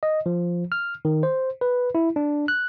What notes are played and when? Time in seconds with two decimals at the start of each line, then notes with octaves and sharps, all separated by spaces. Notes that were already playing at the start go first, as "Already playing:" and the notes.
0.03 D#5
0.26 F3
0.72 F6
1.05 D#3
1.23 C5
1.61 B4
1.95 E4
2.16 D4
2.48 F#6